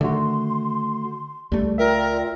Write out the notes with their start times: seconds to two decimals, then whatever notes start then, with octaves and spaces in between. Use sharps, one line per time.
0.01 D3 D#3 A3 F#4 C6
1.52 C#2 G3 A3
1.78 F4 A#4 D5 E5 G5